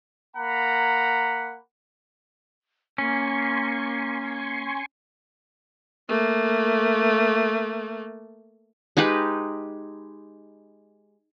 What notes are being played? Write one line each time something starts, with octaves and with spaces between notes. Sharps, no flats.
A#3 F#5 A#5 B5
A#3 C#4 G#5 C6 C#6
A3 A#3
G#3 D#4 G4 B4